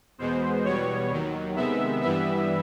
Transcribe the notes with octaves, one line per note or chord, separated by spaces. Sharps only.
E2 B2 G#3 B3 C5
E2 B2 G3 B3 C#5
D#2 D#3 F#3
C3 D#3 G#3 B3 E5
G2 E3 G3 B3 E5